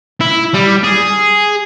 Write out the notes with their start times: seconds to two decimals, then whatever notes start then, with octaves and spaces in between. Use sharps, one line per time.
0.21 E4
0.54 G3
0.84 G#4